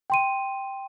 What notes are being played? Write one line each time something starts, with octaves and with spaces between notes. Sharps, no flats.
G5 C6 D#7